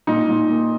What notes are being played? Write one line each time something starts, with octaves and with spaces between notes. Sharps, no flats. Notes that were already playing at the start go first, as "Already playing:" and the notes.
A#2 D#4
A#2
A#3